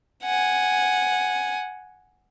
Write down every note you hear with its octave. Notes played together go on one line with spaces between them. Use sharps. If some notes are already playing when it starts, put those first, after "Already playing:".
F#5 G#5